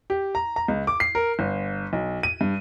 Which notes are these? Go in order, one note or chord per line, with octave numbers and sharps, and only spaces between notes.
G4
A#5
A#5
C#2
D6
C7
A#4
G1
B1
D#7
G2